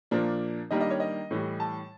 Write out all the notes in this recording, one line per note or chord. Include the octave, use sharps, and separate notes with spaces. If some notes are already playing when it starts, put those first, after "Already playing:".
A#2 F3 A#3 D4
D#3 G3 A#3 D4 D#5
D#5
C#5
D#5
A2 E3 G3
A5